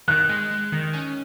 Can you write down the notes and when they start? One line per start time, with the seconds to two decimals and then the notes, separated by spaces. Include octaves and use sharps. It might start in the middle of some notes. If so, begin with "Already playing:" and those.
0.08 D#3 F#6
0.29 G#3
0.51 G#3
0.72 D#3
0.93 C#4